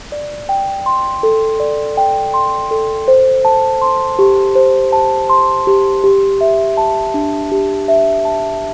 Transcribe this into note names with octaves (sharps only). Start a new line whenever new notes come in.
D5
G5
C6
A4
D5
G5
C6
A4
C5
A5
C6
G4
C5
A5
C6
G4
G4
E5
A5
D4
G4
E5
A5